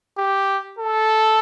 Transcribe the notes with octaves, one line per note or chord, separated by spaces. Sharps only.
G4
A4